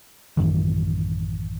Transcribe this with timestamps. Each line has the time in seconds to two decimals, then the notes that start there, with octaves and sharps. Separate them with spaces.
0.37 A1 F#2 D#3 E3